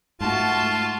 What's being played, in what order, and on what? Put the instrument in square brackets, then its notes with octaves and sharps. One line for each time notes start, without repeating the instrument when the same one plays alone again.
[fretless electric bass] G#2 [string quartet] A3 F#4 [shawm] F4 [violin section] A5